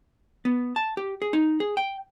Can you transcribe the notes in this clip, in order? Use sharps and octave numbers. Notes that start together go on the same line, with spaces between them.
B3
A5
G4
G#4
D#4
G#4
G5